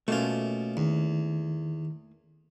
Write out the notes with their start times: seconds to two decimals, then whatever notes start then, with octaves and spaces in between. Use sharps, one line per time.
0.08 B2 A3 A#3 C#4 F4
0.77 E2 D#3